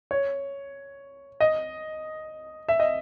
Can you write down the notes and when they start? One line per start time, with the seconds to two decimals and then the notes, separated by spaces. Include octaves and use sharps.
0.11 C#5
1.40 D#5
2.69 E5
2.80 D#5